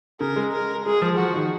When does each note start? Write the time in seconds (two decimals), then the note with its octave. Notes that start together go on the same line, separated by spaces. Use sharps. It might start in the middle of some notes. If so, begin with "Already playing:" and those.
0.20 C#3 A#4
0.36 G#3
0.53 A#4
0.86 G#3 G#4
1.02 F3
1.18 F3 F#4
1.34 D#3